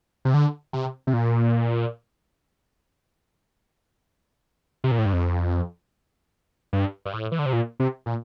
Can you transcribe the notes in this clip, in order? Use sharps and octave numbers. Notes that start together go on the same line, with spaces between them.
C3
D3
C3
C3
A#2
C3
A#2
A2
G2
F2
G2
G2
A2
E3
D3
C3
A#2
C3
A#2